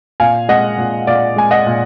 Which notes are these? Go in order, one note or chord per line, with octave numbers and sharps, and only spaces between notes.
A#2 F5 G#5
G#3 D#5 F#5
A#2
A#2 D5 F5
G#3 G#5
D#5 F#5
A#2